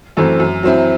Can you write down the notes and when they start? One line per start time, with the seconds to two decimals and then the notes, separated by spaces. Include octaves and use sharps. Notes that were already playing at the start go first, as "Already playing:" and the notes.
0.17 F#2 E3 A3 C4
0.40 F#2
0.63 F#3 C4 E4